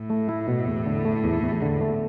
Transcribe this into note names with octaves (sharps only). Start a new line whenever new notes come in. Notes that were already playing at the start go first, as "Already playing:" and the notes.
Already playing: A2
A3
E4
B2
E2
D3
A3
E2
E2
D3
A3